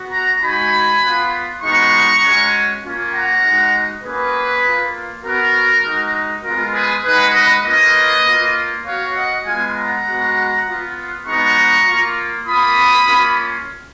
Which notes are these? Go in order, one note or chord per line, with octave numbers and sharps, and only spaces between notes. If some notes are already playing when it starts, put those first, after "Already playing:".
Already playing: B3 F#4
F#5 A#5
G#3 D#4 F#4 G#5 B5
B3 F4
G#3 B3 D#4 F#4 A#5 C#6
G#3 C#4 F#4
A#3 C#4 F4
F#5 A#5
G#3 D#4 F#4
A#3 C#4 F#4 G#4 B4
A#3 F4
B3 F#4 A#4
G#3 D#4 F#4
G#3 B3 F4 A#4
G#4 B4
G#3 D#4 F#4 G#4 B4
B4 D#5
A#3 C#4 F4 B4 D#5
A#3 F4
B3 F#4 C#5 F5
D#5 F#5
G#3 B3 F4 F5 G#5
F#5 A#5
G#3 B3 F#4
B3 F4
G#3 B3 D#4 F#4 A#5 C#6
A#3 F4
A#3 F4 B5 D#6
A#3 C#4 F4